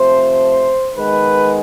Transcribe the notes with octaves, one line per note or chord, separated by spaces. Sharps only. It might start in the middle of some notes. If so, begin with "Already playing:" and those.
Already playing: C3 F3 A3 C5
D#3 G#3 B3 B4